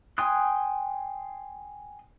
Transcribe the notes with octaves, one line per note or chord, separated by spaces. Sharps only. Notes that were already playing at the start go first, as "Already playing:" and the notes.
G5 G#5 C6 D#6 F#6